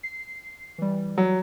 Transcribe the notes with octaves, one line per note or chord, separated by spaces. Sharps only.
C7
E3 G3
F#3